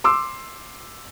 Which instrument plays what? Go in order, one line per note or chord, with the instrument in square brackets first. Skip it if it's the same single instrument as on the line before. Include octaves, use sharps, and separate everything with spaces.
[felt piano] C6 D6 E6